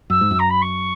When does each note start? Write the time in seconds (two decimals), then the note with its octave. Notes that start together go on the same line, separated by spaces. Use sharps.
0.10 F#2 E6
0.21 G#2
0.31 F#2
0.39 A#5
0.50 B5
0.62 C#6